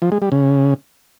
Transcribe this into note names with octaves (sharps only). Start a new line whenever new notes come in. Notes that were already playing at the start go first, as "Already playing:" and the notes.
F3
G#3
G3
C#3